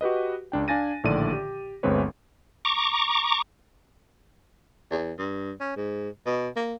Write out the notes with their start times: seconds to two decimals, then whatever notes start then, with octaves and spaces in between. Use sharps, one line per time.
0.01 F#4 G4 B4 D#5
0.52 C#2 D4 G5
0.68 D4 F5 G#5 A6 A#6 D#7
1.04 A#1 A2 D3 D#3 D5 D#7
1.33 G4
1.83 G1 D2 G#3 C4 B4 C#5
2.65 A#5 C#6 D6
4.91 E2
5.18 G2
5.60 C#4
5.76 G#2
6.26 B2
6.56 A#3